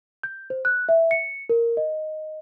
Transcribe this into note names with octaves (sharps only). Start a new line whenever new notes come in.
G6
C5
F#6
E5
C#7
A#4
D#5